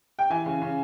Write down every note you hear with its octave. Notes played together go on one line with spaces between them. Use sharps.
G5
E3 G#5
C#3
C#3